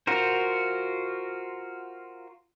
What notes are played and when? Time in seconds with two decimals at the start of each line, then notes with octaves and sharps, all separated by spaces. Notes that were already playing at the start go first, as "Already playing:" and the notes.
0.07 F4 F#4 A#4 C5